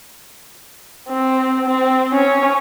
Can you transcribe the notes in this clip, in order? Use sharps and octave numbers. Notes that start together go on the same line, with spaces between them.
C4
C4
C#4